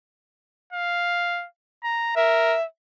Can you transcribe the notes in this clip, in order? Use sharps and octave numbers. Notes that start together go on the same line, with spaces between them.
F5
A#5
A#4 E5